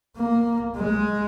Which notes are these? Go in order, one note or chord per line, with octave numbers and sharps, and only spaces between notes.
A#3
G#3